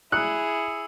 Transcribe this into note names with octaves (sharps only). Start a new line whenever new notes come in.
E4 G#4 D#6 E6 F#6 C#7